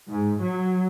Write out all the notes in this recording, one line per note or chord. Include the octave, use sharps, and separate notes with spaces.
G#2
F#3